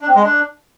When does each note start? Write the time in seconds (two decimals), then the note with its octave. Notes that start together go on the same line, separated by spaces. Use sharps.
0.01 D4
0.08 C4
0.16 G#3
0.23 D4